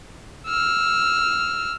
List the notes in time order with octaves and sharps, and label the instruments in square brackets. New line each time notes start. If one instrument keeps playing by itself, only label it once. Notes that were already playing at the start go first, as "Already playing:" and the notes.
[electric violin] E6 F6